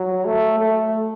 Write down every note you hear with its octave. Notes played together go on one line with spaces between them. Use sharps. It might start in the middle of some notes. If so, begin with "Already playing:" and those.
Already playing: F#3
A3
A3